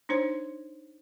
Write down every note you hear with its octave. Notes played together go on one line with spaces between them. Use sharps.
D4 D#4 C5 C#5